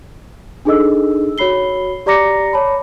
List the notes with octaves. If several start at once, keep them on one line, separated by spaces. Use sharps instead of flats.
D4 D#4 G#4 A4 D#5 E6
F#4 C#5 B5 C7 G7
G4 D5 A#5 D6 A#6 C#7
C#5 A5 B5